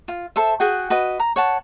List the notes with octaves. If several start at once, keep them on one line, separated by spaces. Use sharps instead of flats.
F4
A4 C5 E5
F#4 G#4 F#5 G5
F#4 B4 D#5
A#5
C#5 F#5 A5